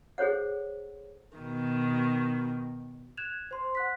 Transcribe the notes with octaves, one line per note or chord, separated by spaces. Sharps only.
G#4 A4 C5 C#5 F#5
B2 D#3
F#6 G#6 E7 F7
C5 C6
F#5 F#6 B6